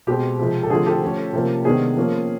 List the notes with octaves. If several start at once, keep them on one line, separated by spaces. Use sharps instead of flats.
B2 G#3 C4 G4
C3 F3 G#3
A4
D3 F3 A3 C4 G#4
G4 A4
F3 A3 C#4
C3 F3 A#3 C#4
C3 D#3 G#3 B3 D4 G#4
F3 A#3 C#4